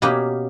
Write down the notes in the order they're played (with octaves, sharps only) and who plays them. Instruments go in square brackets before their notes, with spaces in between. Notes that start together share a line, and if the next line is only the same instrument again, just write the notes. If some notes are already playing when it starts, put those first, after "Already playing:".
[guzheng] B2 A#3 C#4 G4 B4